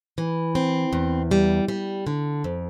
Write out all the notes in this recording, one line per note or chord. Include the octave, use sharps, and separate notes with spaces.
E3
C4
E2
G3
G3
D3
F2